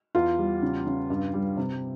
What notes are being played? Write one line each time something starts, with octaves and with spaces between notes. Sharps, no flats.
E2 F4
G3
C#3
C#3
G2
G3
C3